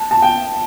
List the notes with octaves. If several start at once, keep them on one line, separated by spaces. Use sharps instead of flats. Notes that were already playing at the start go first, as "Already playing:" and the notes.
Already playing: A5
A5
G5